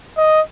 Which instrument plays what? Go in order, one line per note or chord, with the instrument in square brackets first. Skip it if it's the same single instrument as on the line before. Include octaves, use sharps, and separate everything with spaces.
[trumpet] D#5